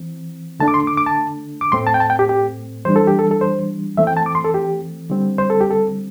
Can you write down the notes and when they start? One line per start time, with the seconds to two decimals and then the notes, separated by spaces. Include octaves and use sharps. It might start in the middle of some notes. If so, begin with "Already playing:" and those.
Already playing: E3 C4
0.60 D3 A3 D4 A5
0.68 D6
0.74 C6
0.87 D6
0.97 D6
1.06 A5
1.61 D6
1.72 A2 A3 C4 C6
1.87 A5
1.94 G5
2.00 A5
2.10 G5
2.19 G4
2.29 G4
2.85 E3 G3 D4 C5
2.96 A4
3.07 G4
3.19 A4
3.31 A4
3.41 C5
3.97 E3 A3 C4 E5
4.07 G5
4.17 A5
4.26 D6
4.35 C6
4.44 A4
4.54 G4
5.10 D3 G3 C4
5.38 C5
5.50 A4
5.61 G4
5.71 A4